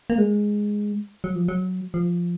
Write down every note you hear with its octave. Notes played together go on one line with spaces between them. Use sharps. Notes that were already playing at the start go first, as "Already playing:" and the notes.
A#3
G#3
F#3
F3
F#3
F3